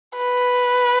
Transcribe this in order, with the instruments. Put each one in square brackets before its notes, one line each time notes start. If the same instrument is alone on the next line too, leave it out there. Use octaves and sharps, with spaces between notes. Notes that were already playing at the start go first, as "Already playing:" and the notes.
[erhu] B4